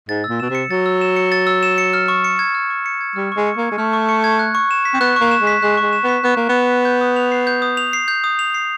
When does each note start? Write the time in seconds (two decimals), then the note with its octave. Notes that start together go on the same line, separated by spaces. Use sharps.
0.09 G#2 A6
0.24 E6
0.29 A#2
0.40 B2 E7
0.50 C3 C#7
0.70 F#3 A6
0.86 E6
1.01 E7
1.16 C#7
1.32 A6
1.47 E6
1.63 E7
1.78 C#7
1.93 F6
2.08 C#6
2.24 C#7
2.39 G#6
2.55 F6
2.70 C#6
2.86 C#7
3.01 G#6
3.16 G3 F6
3.32 G#3 C#6
3.47 C#7
3.57 A#3
3.63 G#6
3.71 G#3
3.78 A3 F6
3.93 C#6
4.09 C#7
4.24 G#6
4.39 F#6
4.55 C#6
4.71 E7
4.85 B6
4.94 C4
5.01 B3 F#6
5.16 A#3 C#6
5.31 E7
5.42 G#3
5.47 B6
5.62 G#3 F#6
5.77 C#6
5.83 G#3
5.93 E7
6.04 B3 B6
6.24 B3 F#6
6.37 A#3 C#6
6.49 B3
6.55 E7
6.70 B6
6.85 G6
7.01 D#6
7.16 F7
7.32 C7
7.47 G6
7.62 D#6
7.77 F7
7.93 C7
8.08 G6
8.24 D#6
8.39 F7
8.54 C7